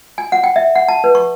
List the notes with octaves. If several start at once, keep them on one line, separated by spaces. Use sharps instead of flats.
G#5
F#5
G5
E5
F#5
A5
B4
C#6